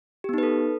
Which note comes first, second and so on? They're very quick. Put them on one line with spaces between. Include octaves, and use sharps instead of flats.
G4 B3 D#4 B4 A4